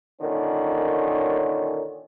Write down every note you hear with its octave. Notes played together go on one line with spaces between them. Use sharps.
A#2 D3 D#3 C#4